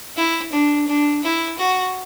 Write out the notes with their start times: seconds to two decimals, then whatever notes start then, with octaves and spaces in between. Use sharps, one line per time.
0.17 E4
0.53 D4
0.88 D4
1.23 E4
1.58 F#4